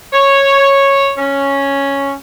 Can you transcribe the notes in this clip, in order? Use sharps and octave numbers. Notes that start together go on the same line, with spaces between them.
C#5
C#4